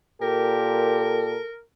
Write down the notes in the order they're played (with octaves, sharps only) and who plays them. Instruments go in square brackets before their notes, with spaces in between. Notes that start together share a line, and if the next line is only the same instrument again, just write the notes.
[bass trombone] A#2 [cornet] G4 [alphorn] A4 [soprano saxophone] A#4